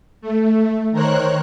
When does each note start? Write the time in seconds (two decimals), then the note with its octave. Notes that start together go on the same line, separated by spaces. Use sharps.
0.21 A3
0.92 D#3 A#4 C5 C#5 F#6